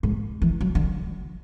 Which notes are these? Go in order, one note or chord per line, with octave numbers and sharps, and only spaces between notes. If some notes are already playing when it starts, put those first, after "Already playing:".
G#2
E3
F#3
D3